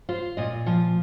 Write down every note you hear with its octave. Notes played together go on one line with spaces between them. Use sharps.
F4 C5
A#2 D#5
F3 F5